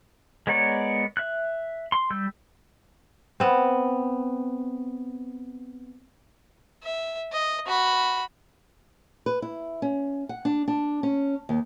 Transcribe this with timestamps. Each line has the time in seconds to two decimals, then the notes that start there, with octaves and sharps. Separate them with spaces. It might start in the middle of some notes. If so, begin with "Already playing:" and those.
0.47 G#3 B3 A#4 C#5 D5
1.17 E5 F#6
1.92 C6
2.10 G3 E6 G6
3.40 B3 C4
6.83 E5
7.33 D#5
7.67 F#4 B5
9.26 B4
9.42 E4
9.82 C#4
10.29 F#5
10.45 D4
10.68 D4
11.03 C#4
11.49 D#2